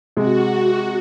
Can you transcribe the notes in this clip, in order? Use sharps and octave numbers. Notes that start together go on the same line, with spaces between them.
C3 G#3 F#4